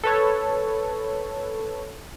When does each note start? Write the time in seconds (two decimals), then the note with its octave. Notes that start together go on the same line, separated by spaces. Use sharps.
0.04 A4 B4 C#5